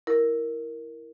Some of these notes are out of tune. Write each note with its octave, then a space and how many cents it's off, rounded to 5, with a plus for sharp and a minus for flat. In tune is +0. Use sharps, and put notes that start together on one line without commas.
E4 +0 A#4 +0